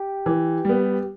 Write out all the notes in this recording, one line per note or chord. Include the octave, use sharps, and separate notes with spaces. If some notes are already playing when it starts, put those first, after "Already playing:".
Already playing: G4
E3
G3 B3